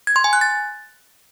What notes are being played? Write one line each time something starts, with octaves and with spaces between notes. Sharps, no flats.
G#6
C6
G#5
F#6
A6